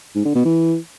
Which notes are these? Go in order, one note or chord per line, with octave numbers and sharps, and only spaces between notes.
G#2
D3
B2
E3